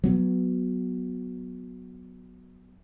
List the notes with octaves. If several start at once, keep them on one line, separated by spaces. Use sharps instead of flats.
F#3 B3